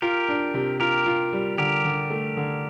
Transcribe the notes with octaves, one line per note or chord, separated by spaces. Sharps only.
F4 G4 A#4
D4
C3
F4 G4 A#4
F4
G3
D3 G4 A#4
D3
A3
D3